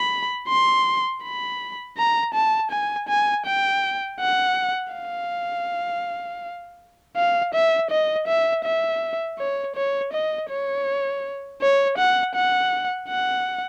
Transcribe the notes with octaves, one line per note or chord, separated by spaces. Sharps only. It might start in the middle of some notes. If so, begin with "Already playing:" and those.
Already playing: B5
C6
B5
A#5
A5
G#5
G#5
G5
F#5
F5
F5
E5
D#5
E5
E5
C#5
C#5
D#5
C#5
C#5
F#5
F#5
F#5